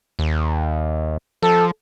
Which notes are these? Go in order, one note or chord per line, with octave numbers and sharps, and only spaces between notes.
D#2
F3 A4